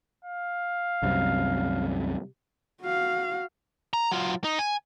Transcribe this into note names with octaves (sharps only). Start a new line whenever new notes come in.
F5
C2 F#2 C3
F#4 F5
A#5
F#3 F4
D#4
G#5